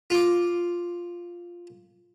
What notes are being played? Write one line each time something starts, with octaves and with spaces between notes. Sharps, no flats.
F4 D6